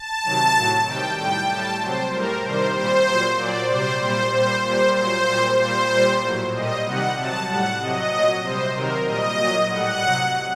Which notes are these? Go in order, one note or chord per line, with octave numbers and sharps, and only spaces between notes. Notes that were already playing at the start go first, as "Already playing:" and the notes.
Already playing: A5
C3 D#3 F#3
A2 F#3
C3 D#3 G3 G5
A2 G3 G5
A2 G3 A5
C3 F#3 C5
A2 G3 A#4
C3 D#3 G3 C5
A#2 G3 C5
A#2 F#3
A#2 F#3 D5
C3 G3 C5
A#2 G3 C5
A#2 G3 C5
A#2 G3 C5
A#2 F#3 C5
A#2 G3
A#2 G3 C5
A#2 G3
A2 F#3
A#2 G3 D#5
C3 D#3 G3 F#5
C3 F#3 A5
A2 G3 F#5
C3 F#3 D#5
A#2 F#3
C3 G3 C5
C3 D#3 F#3 A#4
A#2 G3 D#5
A#2 F#3
A2 G3 F#5
C3 F#3